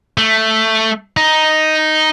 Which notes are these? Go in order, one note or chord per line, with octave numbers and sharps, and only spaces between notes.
A3
D#4